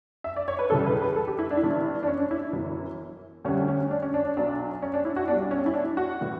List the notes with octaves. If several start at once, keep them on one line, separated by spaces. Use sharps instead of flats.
E5
D5
C#5
B4
C#2 C#3 E3 G3 A4
B4
B4
A4
G4
E4
D4
E4
G1 G2 E3 D4
D4
C#4
D4
E4
G1 F#2 E3
D2 D3 G3 C#4
C#4
D4
C#4
D4
D4
B1 B2 F#3 D4
C#4
D4
E4
F#4
B1 B2 G3 D4
C#4
E4
D4
F#4
A2 E3